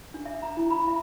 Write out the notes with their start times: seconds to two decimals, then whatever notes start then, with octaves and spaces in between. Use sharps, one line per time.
0.14 D4
0.25 E5
0.42 A#5
0.57 E4
0.71 B5
0.88 E5